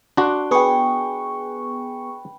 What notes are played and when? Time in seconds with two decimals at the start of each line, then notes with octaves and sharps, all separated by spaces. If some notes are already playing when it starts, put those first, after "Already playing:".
0.17 D4 F#4 C6 D6
0.51 B3 G#4 B4 G5 C#6